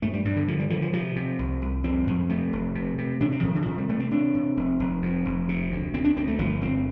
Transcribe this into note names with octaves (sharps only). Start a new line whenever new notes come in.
G2 A3
G3
G2 G3
D3
D3 F3
G3
D3 F3
F3
C3 F3
C3
C2
C2
F2 C4
F2
C3 A3
F1
C3
C3
C3 D4
C4
C3 F3
D3
C3 F3
G3
C3 A3
C4
C3 D4
C3
F1 C4
F1
F2
F1
C3
D2
D2 C4
D4
D2 C4
A3
G1 F3
G1 C4